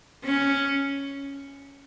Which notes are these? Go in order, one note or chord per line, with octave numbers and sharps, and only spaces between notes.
C#4